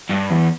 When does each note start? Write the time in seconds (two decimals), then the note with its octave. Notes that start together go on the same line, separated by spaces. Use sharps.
0.11 G2
0.31 E2